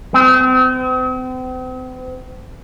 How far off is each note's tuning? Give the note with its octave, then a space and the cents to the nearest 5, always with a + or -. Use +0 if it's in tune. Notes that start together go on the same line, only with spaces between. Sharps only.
C4 -40